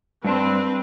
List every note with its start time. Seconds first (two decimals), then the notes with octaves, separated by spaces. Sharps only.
0.25 G2 C4 D4 B4 C5